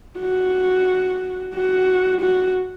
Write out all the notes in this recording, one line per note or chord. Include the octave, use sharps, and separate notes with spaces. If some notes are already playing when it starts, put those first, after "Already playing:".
F#4
F#4
F#4